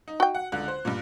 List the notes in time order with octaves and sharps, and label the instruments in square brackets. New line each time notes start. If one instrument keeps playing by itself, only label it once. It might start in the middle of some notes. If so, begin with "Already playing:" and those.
[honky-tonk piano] D#4
[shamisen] F#4 G5
[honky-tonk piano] F#5
C#2 D3 F#6
C5
G2 A#2